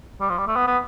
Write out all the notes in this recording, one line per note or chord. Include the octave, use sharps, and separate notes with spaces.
G3
F3
G3
A3
B3
B3